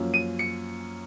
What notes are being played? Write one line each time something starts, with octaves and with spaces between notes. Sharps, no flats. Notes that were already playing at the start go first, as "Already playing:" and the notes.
Already playing: F#2 F3 A#3 C#4
D#7
C#7